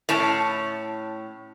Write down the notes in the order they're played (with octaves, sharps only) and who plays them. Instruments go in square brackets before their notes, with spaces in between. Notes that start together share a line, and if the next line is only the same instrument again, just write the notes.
[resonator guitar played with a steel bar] A2 C#4 A5